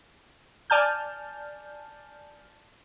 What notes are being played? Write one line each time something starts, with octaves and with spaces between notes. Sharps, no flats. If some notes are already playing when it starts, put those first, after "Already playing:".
D5 G#5 A5 F6 G6